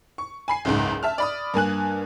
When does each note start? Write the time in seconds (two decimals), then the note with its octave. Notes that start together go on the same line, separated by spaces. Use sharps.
0.18 C#6
0.48 G#5 B5 C7
0.65 F#1 C#2 G#2
1.03 E5 A5 F6
1.18 D5 B5 D#6
1.54 G2 A#3 G#5 F#6